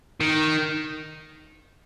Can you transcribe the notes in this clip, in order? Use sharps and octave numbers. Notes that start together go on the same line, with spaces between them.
D#3